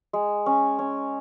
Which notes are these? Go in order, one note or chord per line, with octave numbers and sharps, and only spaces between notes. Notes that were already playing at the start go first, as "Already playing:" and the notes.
G#3
C#4
C#4